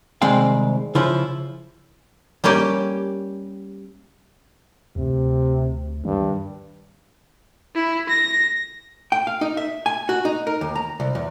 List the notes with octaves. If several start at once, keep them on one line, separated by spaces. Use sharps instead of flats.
C2 D#3 G#3 C4 F5 G5
C#3 F3 E4 F4 C5
G3 A#3 C#4 G4
D2 C3
G2 D#3
E4
A#6
G5
F5
D#4
E5
G#5
F#4
D#4
A#4
D#2
A#5
C2
E2